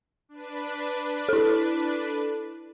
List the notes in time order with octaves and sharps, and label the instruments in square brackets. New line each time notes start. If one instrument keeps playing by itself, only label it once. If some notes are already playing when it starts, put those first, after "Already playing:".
[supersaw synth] D4 B4
[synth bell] E4 A4